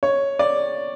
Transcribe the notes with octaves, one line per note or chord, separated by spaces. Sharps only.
C#5
D5